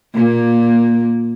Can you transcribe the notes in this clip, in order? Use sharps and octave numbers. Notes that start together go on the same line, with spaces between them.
A#2 A#3